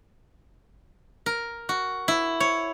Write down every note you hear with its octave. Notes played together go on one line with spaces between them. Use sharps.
A#4
F#4
E4
C#5